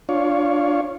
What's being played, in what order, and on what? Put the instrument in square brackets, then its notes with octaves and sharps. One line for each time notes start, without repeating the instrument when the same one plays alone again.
[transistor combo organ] D4 F4 C#5